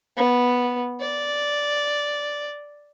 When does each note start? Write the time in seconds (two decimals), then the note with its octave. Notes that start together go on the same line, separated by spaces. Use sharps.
0.17 B3
1.00 D5